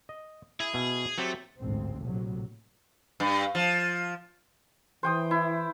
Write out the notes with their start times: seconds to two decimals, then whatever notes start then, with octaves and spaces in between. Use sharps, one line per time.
0.09 D#5
0.60 E4 G#4
0.74 B2 E4 G#5
1.18 F#3 A3 C4 G4
1.60 A1 D2 G#2 C4
2.02 A#1 A2 C3 F#3
3.20 G2
3.55 F3
5.03 E3 C5 G5 D#6
5.31 E4